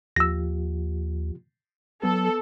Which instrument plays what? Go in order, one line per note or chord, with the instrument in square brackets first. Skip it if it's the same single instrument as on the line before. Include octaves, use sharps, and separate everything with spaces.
[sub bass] D#2 [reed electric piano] F3 F4 G4 [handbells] E6 A#6
[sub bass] F#3 [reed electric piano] B3 [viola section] A4